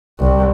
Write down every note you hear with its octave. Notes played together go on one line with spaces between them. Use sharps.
C2